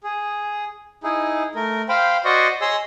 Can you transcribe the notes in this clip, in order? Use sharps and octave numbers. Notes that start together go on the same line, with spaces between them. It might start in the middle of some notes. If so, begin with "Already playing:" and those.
G#4
D#4 E4 G#4
A3 A#4
C5 F5 G5 B5
F#4 C5 D5 D#5 C#6
G#4 C#5 D#5 C6 E6